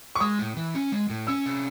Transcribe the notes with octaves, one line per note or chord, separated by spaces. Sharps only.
C#6
G#3 D#6
A2
E3
C#4
G#3
A2
C#4 E6
C3